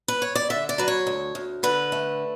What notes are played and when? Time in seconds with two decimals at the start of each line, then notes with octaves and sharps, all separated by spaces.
0.08 B4
0.22 C#5
0.35 D5
0.50 D3 E5
0.69 D5
0.78 F#3 B4
0.88 C#5
1.07 D2
1.35 D2
1.63 D3 B4
1.92 A3